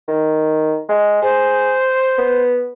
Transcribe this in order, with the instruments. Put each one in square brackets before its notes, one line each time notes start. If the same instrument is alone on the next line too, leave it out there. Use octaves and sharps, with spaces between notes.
[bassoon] D#3
G#3
[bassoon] G#4 [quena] C5
[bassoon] B3